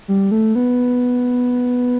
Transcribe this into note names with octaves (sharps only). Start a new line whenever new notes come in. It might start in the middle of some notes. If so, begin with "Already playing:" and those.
G3
A3
B3